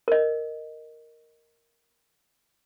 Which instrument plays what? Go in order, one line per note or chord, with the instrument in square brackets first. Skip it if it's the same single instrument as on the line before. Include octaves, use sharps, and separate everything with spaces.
[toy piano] A#4 D#5